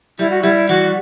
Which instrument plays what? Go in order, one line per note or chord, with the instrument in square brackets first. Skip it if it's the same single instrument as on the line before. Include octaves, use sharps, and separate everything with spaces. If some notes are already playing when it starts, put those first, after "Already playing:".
[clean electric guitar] G3 [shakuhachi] E4
[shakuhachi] F#4
[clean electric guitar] G3 [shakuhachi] E4
[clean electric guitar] E3 [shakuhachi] F#4